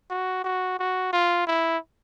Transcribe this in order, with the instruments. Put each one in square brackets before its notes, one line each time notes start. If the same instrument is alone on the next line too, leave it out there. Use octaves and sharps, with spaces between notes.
[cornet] F#4
F#4
F#4
F4
E4